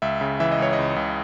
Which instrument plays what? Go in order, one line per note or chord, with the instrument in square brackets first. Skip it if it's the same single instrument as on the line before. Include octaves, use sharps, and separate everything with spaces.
[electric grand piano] C#2 E5
C#3
E3 E5
D#5
C#2 C#5
D#5
C#2
C#2